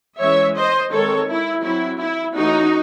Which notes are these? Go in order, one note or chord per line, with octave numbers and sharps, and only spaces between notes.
E3 G#3 C#4 C#5 E5
C5 D#5
D#3 G#3 C4 A4 C#5
E4
F#3 C4 E4
E4
E3 A3 C#4 D#4 F#4